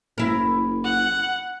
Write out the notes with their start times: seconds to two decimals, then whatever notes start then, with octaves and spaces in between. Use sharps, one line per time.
0.18 F#1 E4 A#4
0.84 F#5